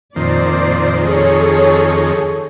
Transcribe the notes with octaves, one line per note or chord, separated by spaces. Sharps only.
F2 A#2 D#3 C5 D5
G#4 A4 C#5